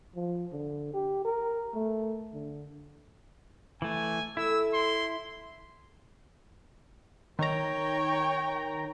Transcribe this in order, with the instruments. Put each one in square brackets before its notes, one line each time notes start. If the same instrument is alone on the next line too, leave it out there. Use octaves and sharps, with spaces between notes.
[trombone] F3
D3
G4
A#4
A3
D3
[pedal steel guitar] E3 A3 [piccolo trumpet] G#5
[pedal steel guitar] E4 [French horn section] A4 [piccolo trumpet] E6
[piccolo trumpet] C6
[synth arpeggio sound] D#3 A#5 [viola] C#5 G5